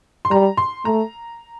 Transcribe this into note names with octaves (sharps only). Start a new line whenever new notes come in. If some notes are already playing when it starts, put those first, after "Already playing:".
C6
G3 A#5
C6
A3 A#5